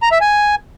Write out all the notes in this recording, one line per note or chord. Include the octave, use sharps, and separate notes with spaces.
A#5
E5
G#5